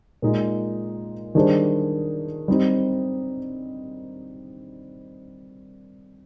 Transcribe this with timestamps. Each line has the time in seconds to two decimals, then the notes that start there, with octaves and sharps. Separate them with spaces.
0.22 A#2 G#3 D#4
1.35 D#3 G3 D4 G#4 C5
2.48 G3 C4 D#4